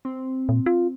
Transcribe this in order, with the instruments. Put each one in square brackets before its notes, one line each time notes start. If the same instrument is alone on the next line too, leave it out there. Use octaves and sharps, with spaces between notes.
[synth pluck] C4
[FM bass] A#2
F4